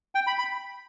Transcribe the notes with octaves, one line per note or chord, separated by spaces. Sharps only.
G5
B5
B5